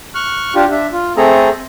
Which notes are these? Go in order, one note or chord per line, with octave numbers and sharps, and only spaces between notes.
C#6 F6 F#6
D4 F4 G4
D4 E5
F4
A3 C4 G#4 A4 A#5